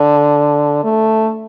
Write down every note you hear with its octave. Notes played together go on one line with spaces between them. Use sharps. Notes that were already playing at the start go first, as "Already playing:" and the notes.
Already playing: D3
A3